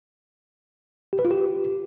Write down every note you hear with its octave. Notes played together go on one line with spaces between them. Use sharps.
G4
B4
F4
G4